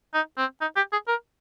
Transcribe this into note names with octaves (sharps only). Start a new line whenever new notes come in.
D#4
C4
D#4
G4
G#4
A#4